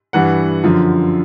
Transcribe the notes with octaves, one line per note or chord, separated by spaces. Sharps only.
G2 E3 F#5
F#2 D3 F3